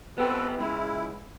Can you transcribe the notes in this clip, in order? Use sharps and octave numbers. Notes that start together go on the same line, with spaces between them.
B3 C4 G4 A4 B4
C#2 G#3 E4